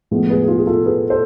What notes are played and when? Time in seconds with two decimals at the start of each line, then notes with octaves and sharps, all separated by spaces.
0.11 A2 F3 G#3 B3
0.30 G#4 B4
0.43 G#4
0.48 F4
0.58 G#4
0.67 F4 A4
0.85 G#4 B4
1.10 A4 C5